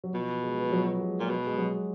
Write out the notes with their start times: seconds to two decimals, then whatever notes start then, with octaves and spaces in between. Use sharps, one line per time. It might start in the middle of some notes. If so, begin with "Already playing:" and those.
0.04 F#3
0.14 B2 F3
0.43 G#3
0.58 B3
0.68 F3
0.72 F#3
1.01 G#3
1.20 A#2
1.30 B2
1.47 G#3
1.58 F#3